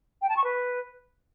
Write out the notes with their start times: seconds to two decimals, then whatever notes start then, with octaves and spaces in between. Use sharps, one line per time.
0.22 G5
0.29 A5
0.36 C#6
0.44 B4